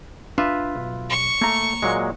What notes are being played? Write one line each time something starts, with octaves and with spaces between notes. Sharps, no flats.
D4 F4 B4 E5
B1
C#6
A3 A#3 A#5
A#2 F#3 G#3